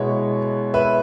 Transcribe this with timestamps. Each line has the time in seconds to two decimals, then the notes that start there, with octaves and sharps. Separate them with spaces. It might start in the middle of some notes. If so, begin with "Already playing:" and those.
Already playing: B2 G#3 B3 E4 C#5
0.74 B4 E5